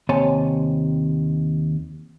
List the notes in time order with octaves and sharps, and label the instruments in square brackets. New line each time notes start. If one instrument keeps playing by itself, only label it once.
[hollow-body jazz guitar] D#2 C3 C#5 G#5 A5 C6